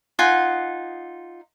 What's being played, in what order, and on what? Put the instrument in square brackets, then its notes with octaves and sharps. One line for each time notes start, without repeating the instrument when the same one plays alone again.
[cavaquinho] D#4 F4 F#5 G#5